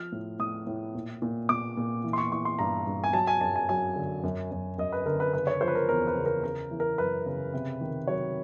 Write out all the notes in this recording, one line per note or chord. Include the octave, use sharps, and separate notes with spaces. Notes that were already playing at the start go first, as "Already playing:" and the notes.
Already playing: F3 F6
A2
A2 D#6
A2
A#2
A#2
A#2 D6
A#2
E3
C6
C#6
E3 C#6
C6
G2 A#5
G2
G#5
F#3 A5
G#5
F#2 A5
G#5
F#3 G#5
D3
F#2
F#2
F#2 D#5
B4
D3 A#4
B4
C#3 B4
C#5
F3 C5
B4
A#4
E2 A#4
B4
C#3
A#4
C#3 A#4
E3
A#4
F#2 B4
C#3
C3
D#3
F#3 C#5